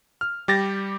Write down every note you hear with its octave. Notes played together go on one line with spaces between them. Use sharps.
F6
G3 G4 A6 A#6